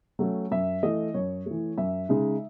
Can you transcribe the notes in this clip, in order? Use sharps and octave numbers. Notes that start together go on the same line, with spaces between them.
F#3 A3 C#4
F#2 E5
E3 A3 D#5
F#2 C#5
E3 A3
F#2 E5
C#3 G#3 D#4